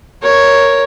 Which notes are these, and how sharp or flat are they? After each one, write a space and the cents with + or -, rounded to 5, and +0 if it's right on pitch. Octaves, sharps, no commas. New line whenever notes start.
A#4 +0 C#5 +0